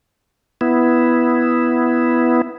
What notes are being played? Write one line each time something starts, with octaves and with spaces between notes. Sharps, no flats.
B3 E4